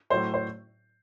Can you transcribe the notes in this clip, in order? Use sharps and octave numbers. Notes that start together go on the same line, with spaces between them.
A2 F#3 A3 C5
C5